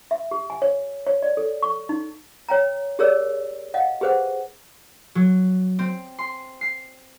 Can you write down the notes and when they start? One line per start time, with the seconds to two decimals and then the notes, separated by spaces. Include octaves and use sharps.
0.11 E5
0.31 G4
0.50 G#5
0.62 C#5
1.07 C#5
1.22 D5
1.37 A4
1.62 C#6
1.89 D#4
2.49 C#5 G5 A#5
2.99 G4 G#4 A#4 C#5 D5 E6
3.74 D#5 F5 F#5
4.01 G4 G#4 B4 C5 F#5
5.15 F#3
5.79 C4
6.19 C6
6.61 C7